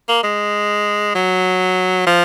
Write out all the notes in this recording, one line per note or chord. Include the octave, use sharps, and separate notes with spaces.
A#3
G#3
F#3
F3